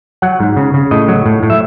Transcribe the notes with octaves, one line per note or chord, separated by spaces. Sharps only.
F#3 F#5
G#2
C#3
C#3
A2 D#5
F#3
A2
A2
E5